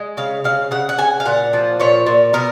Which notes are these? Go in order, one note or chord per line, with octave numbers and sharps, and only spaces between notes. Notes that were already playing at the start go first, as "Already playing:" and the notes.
Already playing: G#3
C#3 F5
C#3 F5
C#3 F#5
F#5
C#3 G#5
F5
A#2 F#5
F3
A#2 C#5
A#2
B2 A#4